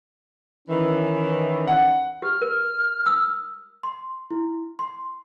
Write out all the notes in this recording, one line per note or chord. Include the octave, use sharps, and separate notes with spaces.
D#3 E3 C#4
F#5
G4 F6
A#4
D#6 E6
C6
E4
C6